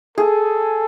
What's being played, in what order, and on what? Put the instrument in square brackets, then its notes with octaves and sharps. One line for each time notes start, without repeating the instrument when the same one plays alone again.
[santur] G#4 [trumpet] A4